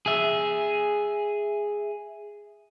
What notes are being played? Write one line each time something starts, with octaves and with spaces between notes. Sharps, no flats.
G#4 E5